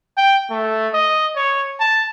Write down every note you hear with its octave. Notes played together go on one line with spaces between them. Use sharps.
G5
A3
D#5
C#5
A5